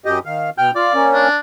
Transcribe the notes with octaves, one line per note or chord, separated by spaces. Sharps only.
F#2 G4 D#5
D#3 F5
B2 G5 F6
F4 D5
A#3 C#4
D4